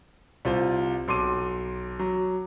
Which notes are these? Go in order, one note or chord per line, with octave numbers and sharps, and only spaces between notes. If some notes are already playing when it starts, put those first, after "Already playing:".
C2 F4 C5
B1 C6 D6 D#7
F#3